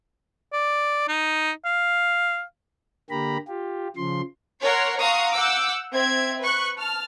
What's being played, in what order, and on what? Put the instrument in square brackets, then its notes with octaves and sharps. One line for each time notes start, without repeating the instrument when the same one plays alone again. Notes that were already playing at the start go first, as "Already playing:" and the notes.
[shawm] D5
D#4
F5
[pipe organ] D3 A#3 G4 A#5 B5
F4 G4
C#3 F3 C6
[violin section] A#4 C#5 F#5 C6
F5 F#5 A#5 C6 C#6 D#6
F#5 D6 E6 G6
C4 E5 G#6
B4 C#6 F#6
A5 F6